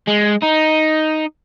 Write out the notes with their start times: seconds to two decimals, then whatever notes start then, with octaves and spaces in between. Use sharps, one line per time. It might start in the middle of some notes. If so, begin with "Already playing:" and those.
0.07 G#3
0.43 D#4